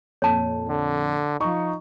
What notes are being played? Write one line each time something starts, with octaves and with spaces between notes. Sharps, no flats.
F2 A#2 C#5 A5
D3
F3 D#4 C#6